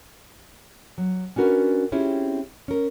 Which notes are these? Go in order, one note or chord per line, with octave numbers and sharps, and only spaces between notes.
F#3
C#4 D4 F#4 A#4 B4
C4 C#4 E4 F4 G4 G#4
C#4 A#4